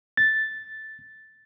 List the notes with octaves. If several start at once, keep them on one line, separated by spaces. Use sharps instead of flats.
A6